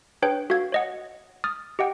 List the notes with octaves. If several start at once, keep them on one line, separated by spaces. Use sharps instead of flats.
D4 G#4 B4 C#5 G5 G6
F#4 A4 F5 G#6
C#5 D#5 F#5
D#6 F6 A6
G4 D#5 F#5 G5